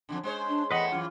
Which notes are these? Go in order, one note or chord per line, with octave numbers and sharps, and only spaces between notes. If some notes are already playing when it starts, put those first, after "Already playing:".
F2 A2 D3
G#3 C5 C#5
D4
E2 A3 B4 D#5 F#5 B5
F#2 E3 F4